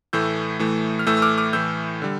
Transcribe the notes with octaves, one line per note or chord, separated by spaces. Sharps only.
A2 E3 A3 E6 G6
A2 E3 A3
F6
A2 E3 A3 E6 G6
E6
D6 F6
D6 F6
A2 E3 A3 E6 G6
D3 G3